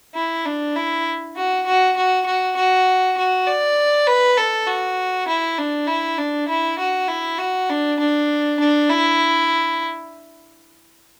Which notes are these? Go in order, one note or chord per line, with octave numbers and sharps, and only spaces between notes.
E4
D4
E4
F#4
F#4
F#4
F#4
F#4
F#4
D5
B4
A4
F#4
E4
D4
E4
D4
E4
F#4
E4
F#4
D4
D4
D4
E4